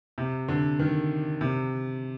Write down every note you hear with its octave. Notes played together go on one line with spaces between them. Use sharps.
C3
D3
D#3
C3